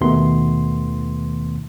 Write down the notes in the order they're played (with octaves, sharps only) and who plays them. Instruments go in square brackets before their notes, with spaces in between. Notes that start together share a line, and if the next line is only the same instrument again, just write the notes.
[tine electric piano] D#2 B2 D#3 A3 B3 C6